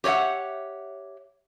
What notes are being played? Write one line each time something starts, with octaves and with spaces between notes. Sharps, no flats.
G4 C#5 D5 E5 F#5